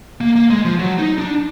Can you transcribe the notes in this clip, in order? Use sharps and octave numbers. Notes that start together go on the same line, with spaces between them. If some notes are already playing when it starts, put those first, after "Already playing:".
A#3
A#3
G#3
F3
F#3
D#4
D4